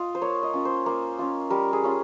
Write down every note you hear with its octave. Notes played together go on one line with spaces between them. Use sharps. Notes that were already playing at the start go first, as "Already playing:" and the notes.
Already playing: F4 D#5 F5
C5
A#3 C#5
D#5
C#4 F4
C5
A#3
C#4 F4
G3 A#4
G#4
C#4 F4